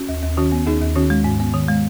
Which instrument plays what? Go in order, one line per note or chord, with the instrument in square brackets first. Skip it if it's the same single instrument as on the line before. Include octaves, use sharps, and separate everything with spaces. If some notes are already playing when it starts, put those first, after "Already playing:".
Already playing: [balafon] C#4 F#4
[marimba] D#2
D#2
[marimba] D#3 [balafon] C#4 F#4
[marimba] B3
[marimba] D#2 [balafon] D#4 G#4
[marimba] D#2
[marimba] D#3 [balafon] C#4 F#4
[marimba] G#3
G#2
B3
D#3
G#3